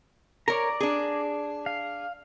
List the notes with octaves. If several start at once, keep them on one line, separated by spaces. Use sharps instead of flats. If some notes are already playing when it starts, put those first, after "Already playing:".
A#4 C#5 D5 A#5
D4 G#4
F5